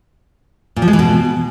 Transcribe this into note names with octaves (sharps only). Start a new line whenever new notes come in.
A#2
F3
G#3
E3
B2